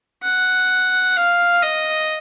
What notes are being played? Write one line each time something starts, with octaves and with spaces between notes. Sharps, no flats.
F#5
F5
D#5